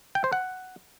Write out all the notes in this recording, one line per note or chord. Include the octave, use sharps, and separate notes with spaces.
G5
C5
F#5